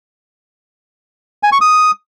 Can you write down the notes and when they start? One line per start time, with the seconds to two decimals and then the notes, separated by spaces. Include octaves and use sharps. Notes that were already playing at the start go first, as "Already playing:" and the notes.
1.43 G#5
1.52 C#6
1.61 D#6